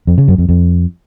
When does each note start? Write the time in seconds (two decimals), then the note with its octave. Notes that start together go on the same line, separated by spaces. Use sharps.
0.07 F2
0.18 C#3
0.28 F#2
0.38 F2
0.49 F2